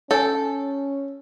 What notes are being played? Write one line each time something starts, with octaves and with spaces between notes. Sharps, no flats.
C#4 A4 C#5 G#5